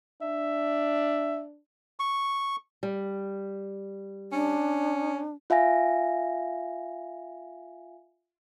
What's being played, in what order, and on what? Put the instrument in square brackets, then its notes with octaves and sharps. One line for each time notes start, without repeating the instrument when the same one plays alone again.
[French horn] D4 [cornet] E5
[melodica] C#6
[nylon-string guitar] G3
[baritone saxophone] C#4 [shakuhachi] D4
[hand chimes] F4 E5 F5 G#5 A#6